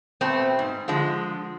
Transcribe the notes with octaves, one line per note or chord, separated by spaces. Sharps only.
B2 A3 C4
G#2
D3 F3 G#3